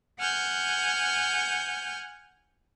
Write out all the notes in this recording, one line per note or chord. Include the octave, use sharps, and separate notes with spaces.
F#5 G#5 F6 G6